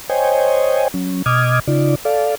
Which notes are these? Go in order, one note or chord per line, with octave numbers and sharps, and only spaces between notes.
C5 C#5 D#5 G5 G#5
F#3 C#4
B2 D#5 D6 D#6 F6 G#6
C#3 D#4 F4 D5
A4 D5 F5